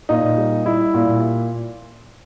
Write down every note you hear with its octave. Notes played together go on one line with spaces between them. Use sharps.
A#2 D#4
G3
G3 E4
A#2